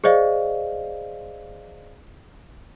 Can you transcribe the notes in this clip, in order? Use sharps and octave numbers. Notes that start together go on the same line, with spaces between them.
G#4 C5 D5 D#5 F5